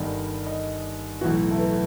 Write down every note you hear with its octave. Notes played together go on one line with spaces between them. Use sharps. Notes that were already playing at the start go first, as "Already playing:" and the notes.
Already playing: G1 G2 D#3 D#5
D#5
B1 A2 E3 F#4
A3
B3